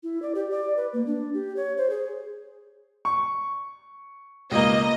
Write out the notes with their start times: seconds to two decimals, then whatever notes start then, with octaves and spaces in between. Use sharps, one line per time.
0.03 E4
0.22 D5
0.35 G4
0.51 D5
0.77 B4
0.93 A#3
1.07 D4
1.34 G4
1.56 C#5
1.77 C5
1.90 G#4
3.05 C#6
4.51 C#2 A#3 D#5